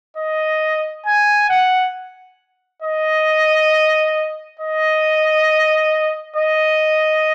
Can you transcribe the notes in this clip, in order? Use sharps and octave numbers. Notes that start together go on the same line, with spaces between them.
D#5
G#5
F#5
D#5
D#5
D#5